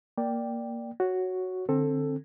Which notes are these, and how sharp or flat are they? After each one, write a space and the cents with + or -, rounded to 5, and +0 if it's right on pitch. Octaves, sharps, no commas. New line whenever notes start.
A#3 +0 D5 +0 G5 +0
F#4 +0 C#5 +0
D3 +20 C4 +25 A4 +5